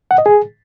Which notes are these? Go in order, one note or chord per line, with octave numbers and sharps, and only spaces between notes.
F#5
D#5
G#4